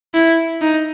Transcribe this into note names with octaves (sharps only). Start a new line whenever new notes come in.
E4
D#4